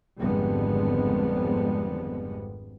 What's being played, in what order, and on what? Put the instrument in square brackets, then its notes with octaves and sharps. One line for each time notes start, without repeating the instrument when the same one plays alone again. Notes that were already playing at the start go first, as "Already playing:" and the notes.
[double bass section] G#1 F2 D3 G3 G#3 B3